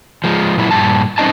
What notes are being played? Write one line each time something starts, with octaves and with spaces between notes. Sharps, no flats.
F3 G#3
A#2 F#3 E4
G2 A#2 A5
F#2 C4 C#4 D#4 D#5 A5